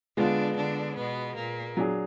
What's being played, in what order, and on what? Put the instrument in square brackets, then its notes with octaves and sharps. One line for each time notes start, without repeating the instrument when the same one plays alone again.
[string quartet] D3 D4 [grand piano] G#3 B3 F4
[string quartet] D3 D4
B2 B3
A#2 A#3
[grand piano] F#3 D4 G#4